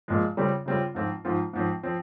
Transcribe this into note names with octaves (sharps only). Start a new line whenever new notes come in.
A#2 F3 G#3
C#3 G3 C4 F4
C#3 G3 C4 F4
G#2 F3 C4 F4
G#2 F3 C4 F4
G#2 F3 C4
F3 C4